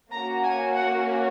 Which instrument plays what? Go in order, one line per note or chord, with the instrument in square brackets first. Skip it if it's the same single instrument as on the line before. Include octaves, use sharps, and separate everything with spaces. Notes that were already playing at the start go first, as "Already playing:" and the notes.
[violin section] A#3 C#4 F#4 A#5
G#5
F#5